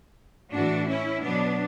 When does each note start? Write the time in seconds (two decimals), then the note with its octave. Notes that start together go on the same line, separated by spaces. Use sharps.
0.52 A2 E3 D4 F#4
0.88 C#4 E4
1.22 B2 F#3 B3 D4